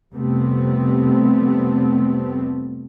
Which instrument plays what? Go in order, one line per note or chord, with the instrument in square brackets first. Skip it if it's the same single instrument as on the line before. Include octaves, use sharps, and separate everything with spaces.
[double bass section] F1 C3 G3 A3 B3 C4